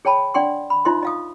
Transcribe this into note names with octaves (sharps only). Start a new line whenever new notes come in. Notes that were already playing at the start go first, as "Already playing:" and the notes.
G#4 C#5 G5 A5 B5
D4 D5 F#5 G5 C6 C#6
B5
D#4 F4 C5 D#5 E5 C6
D#5 F5 D#6